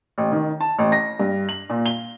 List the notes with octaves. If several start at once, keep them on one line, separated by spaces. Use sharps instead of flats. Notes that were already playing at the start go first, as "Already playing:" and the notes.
A1
D#3
A5
A1
A#6
G2
F#7
A#2
G7